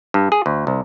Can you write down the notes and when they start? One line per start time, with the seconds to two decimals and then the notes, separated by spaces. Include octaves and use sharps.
0.14 G2
0.32 G#4
0.46 D2
0.67 C2